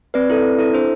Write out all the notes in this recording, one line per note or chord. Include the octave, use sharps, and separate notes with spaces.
C4 B4 D5
E4 A4
C4
E4 A4
D4 C5